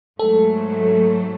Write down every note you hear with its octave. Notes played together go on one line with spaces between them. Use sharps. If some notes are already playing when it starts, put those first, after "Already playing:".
G#2 F#3 A3 A4